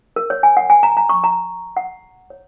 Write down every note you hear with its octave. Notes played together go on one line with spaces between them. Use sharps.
A#4
C#5
G#5
F#5
G#5
A#5
A#5
C#6
A#5
F#5
C#5